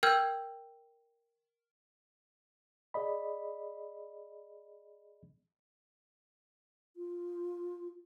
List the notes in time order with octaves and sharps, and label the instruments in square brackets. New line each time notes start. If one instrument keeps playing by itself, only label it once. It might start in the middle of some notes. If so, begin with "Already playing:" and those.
[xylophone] A#4 G5 E6 F6 G6 G#6
[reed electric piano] G#4 D5 D#5 B5
[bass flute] F4